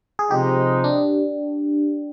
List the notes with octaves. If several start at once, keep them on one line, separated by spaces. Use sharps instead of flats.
G#4
C3 F3 G#3 D#4 G4
D4